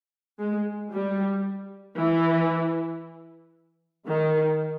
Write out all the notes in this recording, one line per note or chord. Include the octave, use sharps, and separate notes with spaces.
G#3
G3
E3
D#3